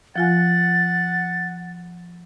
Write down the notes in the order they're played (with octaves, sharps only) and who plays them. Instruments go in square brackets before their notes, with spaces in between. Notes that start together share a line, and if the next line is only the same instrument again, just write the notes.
[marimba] F3 F4 G#5 [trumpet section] F#5 [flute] A6